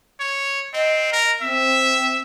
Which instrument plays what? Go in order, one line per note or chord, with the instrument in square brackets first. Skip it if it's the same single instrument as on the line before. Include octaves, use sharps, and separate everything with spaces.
[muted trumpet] C#5
[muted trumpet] C4 [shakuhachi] D#5
[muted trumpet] A#4
[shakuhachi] C4 [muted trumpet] E5